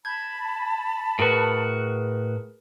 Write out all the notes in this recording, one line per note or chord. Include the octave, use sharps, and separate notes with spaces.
A5 B5 G6 G#6
A2 F#4 G#4 A#4 B4